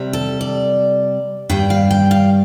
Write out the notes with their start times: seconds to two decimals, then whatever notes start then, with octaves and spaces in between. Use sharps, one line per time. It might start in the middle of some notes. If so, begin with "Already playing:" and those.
Already playing: C3 G3
0.13 A4
0.41 D5
1.50 G2 G3 G5
1.70 F5
1.91 G5
2.11 F5